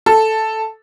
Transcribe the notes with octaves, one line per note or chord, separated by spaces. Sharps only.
A4